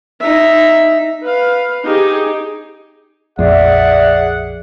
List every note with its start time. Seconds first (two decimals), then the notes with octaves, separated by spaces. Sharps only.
0.20 D#4 E5
1.24 B4 F5
1.85 D#4 G4 G#4
3.39 A#1 F2 G#4 D5 E5 F#5